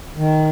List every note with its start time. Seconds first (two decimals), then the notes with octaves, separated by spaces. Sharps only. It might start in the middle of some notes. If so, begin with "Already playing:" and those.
0.16 D#3